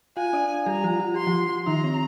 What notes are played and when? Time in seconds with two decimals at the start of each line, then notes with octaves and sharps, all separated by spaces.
0.17 F4 F5 G#5
0.33 D4 D5
0.66 G3 G4 A#5
0.84 F3 F4
1.00 F4
1.14 G4 C6
1.27 F3 F4
1.66 D#3 D#4 A#5
1.84 C4